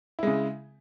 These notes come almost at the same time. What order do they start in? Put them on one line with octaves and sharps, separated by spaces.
E4 G#3 C#3